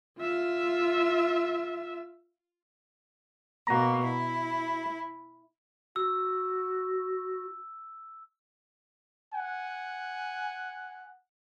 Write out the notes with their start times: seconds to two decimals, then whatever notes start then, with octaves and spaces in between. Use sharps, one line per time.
0.19 F4 E5
3.67 B2 A#3 F#4 A#5
4.02 E4
5.96 F#4 E6
9.33 F#5 G#5